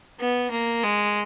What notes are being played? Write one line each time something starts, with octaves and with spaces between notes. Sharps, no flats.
B3
A#3
G#3